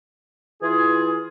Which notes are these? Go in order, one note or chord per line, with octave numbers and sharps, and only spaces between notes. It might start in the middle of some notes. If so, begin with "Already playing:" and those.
E3 F4 G#4